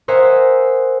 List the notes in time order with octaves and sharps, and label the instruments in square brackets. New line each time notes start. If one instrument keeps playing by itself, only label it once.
[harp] A#4 C5 D#5 E5 F#5 G#5